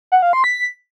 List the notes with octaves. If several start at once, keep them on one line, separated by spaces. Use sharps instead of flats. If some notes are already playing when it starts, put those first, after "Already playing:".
F#5
F5
C6
B6